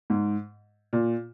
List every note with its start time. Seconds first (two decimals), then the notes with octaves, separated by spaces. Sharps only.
0.10 G#2
0.93 A#2